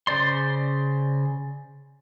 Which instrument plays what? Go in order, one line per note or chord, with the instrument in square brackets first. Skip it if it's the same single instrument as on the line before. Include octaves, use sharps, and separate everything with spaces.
[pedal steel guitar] C#3 C5 D5 C6